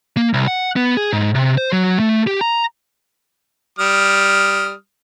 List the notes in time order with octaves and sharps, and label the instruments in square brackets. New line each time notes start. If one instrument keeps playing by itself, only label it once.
[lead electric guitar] A#3
C2
F#5
B3
G#4
G#2
C3
C5
F#3
A3
G4
A#5
[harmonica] G3 D#6 F6